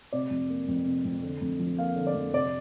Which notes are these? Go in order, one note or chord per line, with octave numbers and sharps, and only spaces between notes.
C3 D5
F2
A#3
F2
C3
F2
D3
F2
F3
A#3 F5
D3
D5
F2
C3 D5